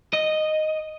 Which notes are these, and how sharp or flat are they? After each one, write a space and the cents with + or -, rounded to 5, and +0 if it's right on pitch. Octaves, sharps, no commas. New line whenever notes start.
D#5 -5